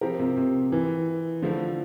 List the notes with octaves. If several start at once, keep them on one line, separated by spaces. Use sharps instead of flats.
F3 C4 G4 A#4
C3
C3
E3
D3 F3 A3 E4